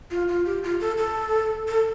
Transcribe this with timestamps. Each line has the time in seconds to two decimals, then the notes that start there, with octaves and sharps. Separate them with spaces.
0.11 F4
0.28 F4
0.46 G4
0.64 F4
0.80 A4
0.98 A4
1.68 A4